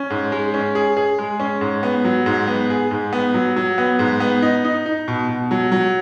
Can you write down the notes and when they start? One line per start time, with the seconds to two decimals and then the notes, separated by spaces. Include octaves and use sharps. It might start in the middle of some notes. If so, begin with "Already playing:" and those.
Already playing: C#4
0.10 G#2
0.32 G#3
0.54 C#4
0.75 G#4
0.97 G#4
1.18 G#3
1.40 C#4
1.61 G#2
1.83 B3
2.05 F#3
2.26 G#2
2.48 B3
2.70 G#4
2.91 G#2
3.13 B3
3.34 F#3
3.56 F#3
3.78 B3
3.99 G#2
4.20 B3
4.42 D#4
4.64 D#4
4.86 D#4
5.08 B2
5.29 B2
5.51 F#3
5.72 F#3